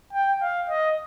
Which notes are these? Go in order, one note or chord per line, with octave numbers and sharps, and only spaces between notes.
G5
F5
D#5